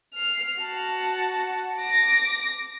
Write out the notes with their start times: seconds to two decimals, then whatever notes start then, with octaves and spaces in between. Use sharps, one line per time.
0.14 F6 C7
0.61 F#4 A5
1.80 D6 A#6